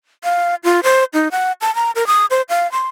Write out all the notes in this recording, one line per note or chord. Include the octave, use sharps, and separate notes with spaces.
F5
F4
C5
D#4
F#5
A5
A#5
A#4
D#6
C5
F5
C6